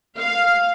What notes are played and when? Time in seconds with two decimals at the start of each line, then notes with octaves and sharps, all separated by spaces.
0.17 F5